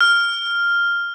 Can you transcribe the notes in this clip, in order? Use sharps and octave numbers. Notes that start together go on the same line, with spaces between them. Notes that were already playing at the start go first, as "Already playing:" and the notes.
F6